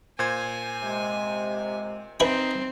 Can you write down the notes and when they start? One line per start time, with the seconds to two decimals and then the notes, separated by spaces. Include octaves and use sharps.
0.19 A#2 C5 G#5 G#6
0.83 C3 G#3
2.20 C4 D#4 B4 E5 G#5